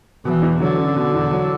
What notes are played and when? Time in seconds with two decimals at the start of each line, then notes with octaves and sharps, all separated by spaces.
0.25 B2 E3
0.42 E2
0.60 D3 F#3
0.77 C#4
0.96 B2
1.14 E2
1.31 F#3